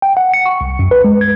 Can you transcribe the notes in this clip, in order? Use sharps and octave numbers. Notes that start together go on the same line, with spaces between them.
G5
F#5
C#7
C#6
C2
F#2
B4
G#3
G#6